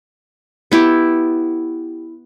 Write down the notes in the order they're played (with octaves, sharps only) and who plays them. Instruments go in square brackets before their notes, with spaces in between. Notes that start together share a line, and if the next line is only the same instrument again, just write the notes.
[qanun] B3 E4 G4